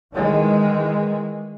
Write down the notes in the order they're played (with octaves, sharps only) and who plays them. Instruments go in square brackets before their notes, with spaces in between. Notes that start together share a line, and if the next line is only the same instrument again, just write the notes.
[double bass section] D#3 E3 G#3